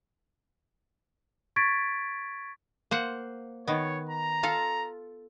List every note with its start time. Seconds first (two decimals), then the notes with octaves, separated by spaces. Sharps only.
1.56 C#6 G#6 A6 B6 D7
2.91 A#3 C5 F#5
3.67 D#3 B3 C#5
4.09 A#5
4.43 F4 A4 F5